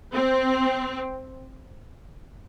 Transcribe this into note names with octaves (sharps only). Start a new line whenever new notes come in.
C4